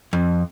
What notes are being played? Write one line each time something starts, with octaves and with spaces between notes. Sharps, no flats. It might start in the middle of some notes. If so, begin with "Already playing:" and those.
F2